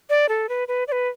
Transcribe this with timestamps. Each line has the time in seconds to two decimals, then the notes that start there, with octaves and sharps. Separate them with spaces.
0.10 D5
0.29 A4
0.49 B4
0.68 B4
0.88 D5
0.92 B4